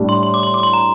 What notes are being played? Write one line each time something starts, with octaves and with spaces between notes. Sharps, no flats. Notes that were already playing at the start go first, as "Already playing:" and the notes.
Already playing: A2 G3 D4
C6
C6
D6
C6
D6
C6
A#5